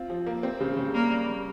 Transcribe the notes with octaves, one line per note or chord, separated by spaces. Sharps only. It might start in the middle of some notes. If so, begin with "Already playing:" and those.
Already playing: C4 F4
F3
A#3
C4
C#3
C#3
G3 A#3
G3